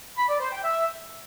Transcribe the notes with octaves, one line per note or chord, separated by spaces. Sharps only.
B5
D5
C5
G5
E5